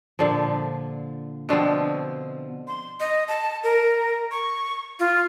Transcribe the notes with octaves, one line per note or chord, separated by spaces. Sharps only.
A#2 D3 F3
B2 D3 F3 C4
C6
D#5
A5
A#4
C#6
F4